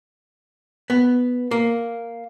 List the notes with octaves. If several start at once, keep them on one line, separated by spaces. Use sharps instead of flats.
B3
A#3